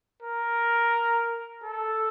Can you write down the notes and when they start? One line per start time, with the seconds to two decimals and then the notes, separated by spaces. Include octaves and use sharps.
0.22 A#4
1.63 A4